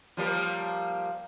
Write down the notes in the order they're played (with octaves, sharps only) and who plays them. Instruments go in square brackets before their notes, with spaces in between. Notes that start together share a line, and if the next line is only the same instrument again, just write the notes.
[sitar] F3 G3 A#3